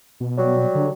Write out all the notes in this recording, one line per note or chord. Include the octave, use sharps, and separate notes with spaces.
B2
F#3 G3
D3